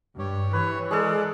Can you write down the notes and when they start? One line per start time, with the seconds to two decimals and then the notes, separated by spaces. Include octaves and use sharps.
0.19 G2 G4 C#5
0.53 E3 B4 C#5
0.91 G#3 G#4 A4 D5 F#6